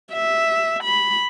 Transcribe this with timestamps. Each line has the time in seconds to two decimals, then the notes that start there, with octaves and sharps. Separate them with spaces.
0.13 E5
0.84 B5